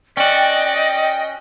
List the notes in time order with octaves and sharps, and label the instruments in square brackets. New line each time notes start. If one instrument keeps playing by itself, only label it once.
[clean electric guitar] C#4 F#4 [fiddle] D5 [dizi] D#5 [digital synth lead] G5